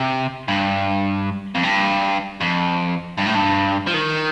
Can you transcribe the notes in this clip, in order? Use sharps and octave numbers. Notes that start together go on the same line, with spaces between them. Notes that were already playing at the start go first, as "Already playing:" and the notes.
Already playing: C3
G2
F2
G2
F2
G2
A2
G2
F3
D#3